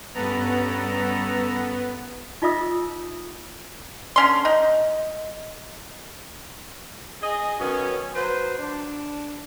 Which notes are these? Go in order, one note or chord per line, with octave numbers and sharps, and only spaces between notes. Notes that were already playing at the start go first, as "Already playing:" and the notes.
G2 G3 B3 C#4 A4 A#5
D#4 F4 D#5 E5 D#6 E6
D3 C#4 C6
D#4
G#4 D#5
D#3 F#3 B3 C#4
F#3 B4 C5
D4